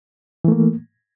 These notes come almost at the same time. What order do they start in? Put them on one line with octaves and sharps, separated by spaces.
E3 A3 A#3